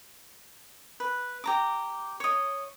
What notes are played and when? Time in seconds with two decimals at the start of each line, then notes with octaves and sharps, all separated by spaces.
1.00 B4
1.44 G4 A#5 D6
2.20 C#5 D#5